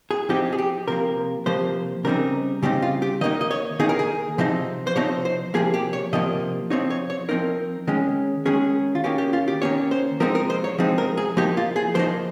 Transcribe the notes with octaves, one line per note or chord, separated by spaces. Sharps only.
G#4
F3 C4 D#4 G4
G#4
G4
C3 F3 A#3 A#4
C3 F3 A#3 C5
C#3 G3 C4 D#4 A#4
C#3 G3 C4 D#4 G4
F4
G4
D#3 A#3 D#4 D#5
D#5
C#5
D#3 A#3 D#4 G#4
A#4
G#4
C3 F3 C4 D#4
C5
C3 F3 C4 D#4 C#5
C5
C3 F3 A#3 G#4
G4
C#5
C3 F3 A#3 D#5
F3 C4 D#4 C#5
C#5
C#5
F3 C4 D#4 A#4
D#3 G#3 C#4
D#3 G#3 C#4 G#4
F4
D#3 A#3 C#4 G4
G4
F4
G4
D#3 A#3 C#4 C#5
C5
F3 G#3 C4 D#4 A#4
A#4
C5
C#5
F3 G#3 C4 D#4
A#4
G#4
F3 A#3 D#4 G4
F4
G#4
F3 A#3 D#4 C5